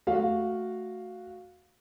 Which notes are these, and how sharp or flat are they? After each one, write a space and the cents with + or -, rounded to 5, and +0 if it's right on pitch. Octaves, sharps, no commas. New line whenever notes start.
A3 +0 F#4 -5 F5 +0